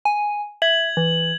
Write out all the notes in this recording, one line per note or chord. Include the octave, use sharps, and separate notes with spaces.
G#5
E5 G#6 F#7
E3